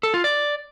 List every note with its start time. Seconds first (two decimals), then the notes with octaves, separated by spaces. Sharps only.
0.03 A4
0.14 F4
0.24 D5